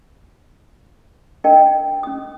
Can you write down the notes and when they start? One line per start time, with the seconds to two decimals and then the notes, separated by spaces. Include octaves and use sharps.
1.44 D4 A#4 D#5 G5 A5
2.03 C#4 D#6